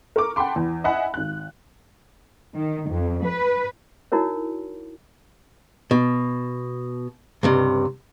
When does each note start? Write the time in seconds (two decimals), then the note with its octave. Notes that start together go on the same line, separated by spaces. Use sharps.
0.16 A#4 C#6 D6
0.36 F#5 G5 A5 B5 C6 D6
0.56 E2
0.84 D#5 E5 F#5 G#5 B5
1.14 G#1 F#6
2.55 D#3
2.89 F2
3.24 B4
4.12 D#4 E4 F#4 A#4 C#5
5.91 B2
7.43 C#2 G2 C3